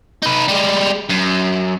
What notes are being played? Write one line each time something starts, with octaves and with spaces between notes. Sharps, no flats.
D#4 B4
G3 G#3
F#2